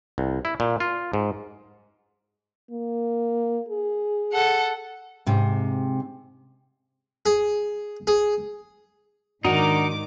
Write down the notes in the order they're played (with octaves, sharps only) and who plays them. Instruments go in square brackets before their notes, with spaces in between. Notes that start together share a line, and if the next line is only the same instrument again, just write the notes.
[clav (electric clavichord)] C2
E4
A#2
F4
G#2
[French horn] A#3
G#4
[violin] A4 F#5
[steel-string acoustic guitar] G#2 C3
[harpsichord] G#4
G#4
[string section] G#2 D#3 D6 [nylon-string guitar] D4 F#4 [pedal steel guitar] D#4 A#4